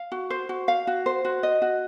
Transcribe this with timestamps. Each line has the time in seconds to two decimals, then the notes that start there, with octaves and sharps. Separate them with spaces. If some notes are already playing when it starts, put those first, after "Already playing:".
Already playing: F5
0.12 F#4
0.30 C5
0.49 F#4
0.68 F5
0.87 F#4
1.06 C5
1.25 F#4
1.43 D#5
1.62 F#4